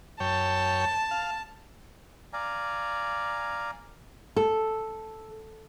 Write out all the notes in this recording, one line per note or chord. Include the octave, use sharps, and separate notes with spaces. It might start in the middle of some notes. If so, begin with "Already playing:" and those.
F#2 C#5 G5 A5
F5
D5 F5 G#5 A#5
A4